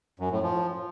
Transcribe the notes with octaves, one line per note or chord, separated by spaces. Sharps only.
F#2
A2
F3